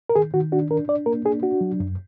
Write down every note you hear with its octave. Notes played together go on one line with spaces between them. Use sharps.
A#4
D#3 G#4
D#3 F#4
D4 F#4
D4 A#4
D4 D5
A#3 A#4
D4 G#4
D4 F#4
F#3
F#2